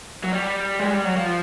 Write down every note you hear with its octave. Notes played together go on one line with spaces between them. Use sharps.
F#3
G3
G#3
G3
F#3
F3